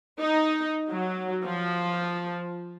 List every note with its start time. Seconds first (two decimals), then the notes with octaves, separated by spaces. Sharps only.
0.20 D#4
0.90 F#3
1.45 F3